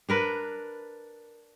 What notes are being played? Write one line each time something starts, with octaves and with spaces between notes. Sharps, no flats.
D4 A#4 B4